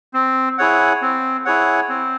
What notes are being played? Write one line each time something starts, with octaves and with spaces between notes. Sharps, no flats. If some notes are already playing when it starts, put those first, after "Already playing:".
C4
E4 G#4 C#5 F#5
C4
E4 G#4 C#5 F#5
C4